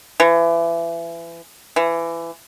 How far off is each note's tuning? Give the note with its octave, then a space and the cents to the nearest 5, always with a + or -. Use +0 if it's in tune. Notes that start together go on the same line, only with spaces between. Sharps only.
E3 +30
E3 +25